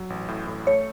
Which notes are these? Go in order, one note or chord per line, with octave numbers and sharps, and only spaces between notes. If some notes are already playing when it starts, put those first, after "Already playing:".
Already playing: F#3
A1
A2
A2
A3 C#5